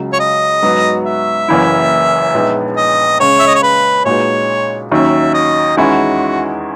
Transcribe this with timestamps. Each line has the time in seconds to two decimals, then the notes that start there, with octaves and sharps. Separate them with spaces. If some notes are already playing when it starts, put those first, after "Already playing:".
Already playing: C#2 C#3 F#3
0.13 C#5
0.20 D#5
0.63 G#2 F#3 B3 F#4
1.05 E5
1.48 F#1 F#2 E3 A#3 E4
2.34 A#1 A#2 G#3 B3 D#4
2.77 D#5
3.20 C#3 G#3 C#4 C#5
3.39 E5
3.47 D#5
3.55 C#5
3.63 B4
4.05 A#2 G#3 D#4 F#4 B4 C#5
4.91 D#2 D#3 F#3 C#4 E5
5.34 D#5
5.77 E2 D#3 G#3 C#4 E4 F#4